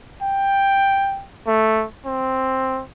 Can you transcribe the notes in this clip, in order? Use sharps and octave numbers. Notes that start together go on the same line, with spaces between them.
G5
A3
C4